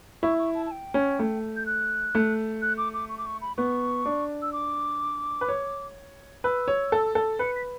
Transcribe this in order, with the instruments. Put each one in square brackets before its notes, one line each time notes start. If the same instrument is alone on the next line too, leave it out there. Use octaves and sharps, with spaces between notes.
[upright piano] E4 [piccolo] C#6
[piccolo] C#6
A5
A5
G5
[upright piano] C#4
A3
[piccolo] G6
F#6
[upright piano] A3
[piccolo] F#6
D6
D6
C#6
D6
C#6
B5
[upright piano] B3 [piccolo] C#6
[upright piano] D4
[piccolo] E6
D6
[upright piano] B4
C#5
[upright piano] B4 [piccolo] E6
[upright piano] C#5
A4
A4
[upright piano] B4 [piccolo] C#7
[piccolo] B6